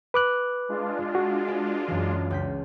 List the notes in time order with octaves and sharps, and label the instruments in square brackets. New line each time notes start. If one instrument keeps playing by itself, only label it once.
[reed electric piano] B4 D6 F#6
[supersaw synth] G#3 D4 F4
[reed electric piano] F#4
[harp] B4 D5 G#5
F#2 E3
C#2 G6 B6